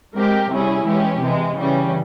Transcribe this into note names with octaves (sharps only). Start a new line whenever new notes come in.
G#3 C4 G4 A#4
C3 G3 C#4 E4 G#4
E3 G#3 C#4 G4
C3 E3 G#3
C#3 E3 G3 C#4